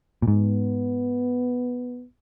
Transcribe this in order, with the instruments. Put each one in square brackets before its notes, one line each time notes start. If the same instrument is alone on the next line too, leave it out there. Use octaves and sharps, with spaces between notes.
[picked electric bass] A#2
[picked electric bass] G#2 [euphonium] B3